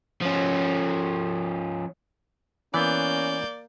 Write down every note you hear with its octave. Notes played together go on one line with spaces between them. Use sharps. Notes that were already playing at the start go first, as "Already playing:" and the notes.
F3 C#4
E3 A#3 B3 C#4 D5 G6